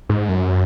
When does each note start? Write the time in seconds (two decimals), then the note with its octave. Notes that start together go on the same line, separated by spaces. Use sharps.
0.09 G#2
0.29 F#2